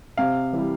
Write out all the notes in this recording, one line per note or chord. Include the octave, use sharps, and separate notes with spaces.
C3 F5
E3 G3